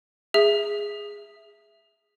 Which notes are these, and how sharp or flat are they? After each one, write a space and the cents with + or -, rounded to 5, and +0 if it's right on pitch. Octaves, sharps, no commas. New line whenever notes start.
G#4 -10 E5 +0